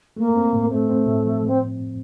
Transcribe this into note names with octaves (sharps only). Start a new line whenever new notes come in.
A3 A#3
C4
A2
A3 C4
C4
A2
F3
A2
C4